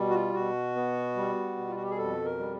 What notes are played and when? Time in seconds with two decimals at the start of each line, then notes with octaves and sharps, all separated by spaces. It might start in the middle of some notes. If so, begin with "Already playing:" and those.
Already playing: B2 G3
0.10 F#4
0.14 F4
0.34 B2 F#4
0.75 B3
1.16 G3
1.57 B2
1.68 F4
1.76 F#4
1.83 G4
1.90 G#4
1.97 F2 A4
2.25 A#4
2.38 G3